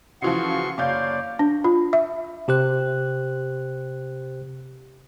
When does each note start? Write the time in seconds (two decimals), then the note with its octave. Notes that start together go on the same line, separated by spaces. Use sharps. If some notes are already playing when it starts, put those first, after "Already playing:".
0.22 C#3 E3 F3 F#4 C6 C#6
0.78 F#1 C#5 D5 F5 G6
1.39 D4
1.64 F4
1.93 E5
2.48 C3 G4 C5 F#6